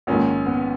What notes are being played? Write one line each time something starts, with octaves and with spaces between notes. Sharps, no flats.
A#1 G#2 D#3 C#4
B3